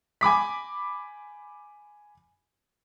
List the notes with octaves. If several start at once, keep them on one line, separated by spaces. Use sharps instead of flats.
G#5 B5 D6 B6